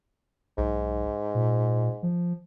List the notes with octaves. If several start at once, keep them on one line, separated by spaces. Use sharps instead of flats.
B1 G#2
A#2
F3